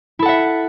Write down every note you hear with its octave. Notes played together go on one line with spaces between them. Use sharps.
E4 A4 E5 F#5